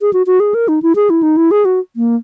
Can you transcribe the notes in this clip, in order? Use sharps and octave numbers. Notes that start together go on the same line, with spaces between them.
G#4
F#4
F#4
G#4
A#4
D#4
E4
G#4
E4
D#4
E4
G#4
F#4
A#3